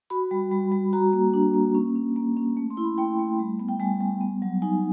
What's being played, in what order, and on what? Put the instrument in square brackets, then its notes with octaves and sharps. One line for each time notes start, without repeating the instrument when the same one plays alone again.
[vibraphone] F#4 B5
G3
G3
G3
F#4 A#5
A#3
D4
A#3
C#4
C#4
A#3
C#4
A3
C6
E4
B5
A3 G5
A3
G3
B3
G5
G3 G#5
G3
B3
F#3
D#4 G#5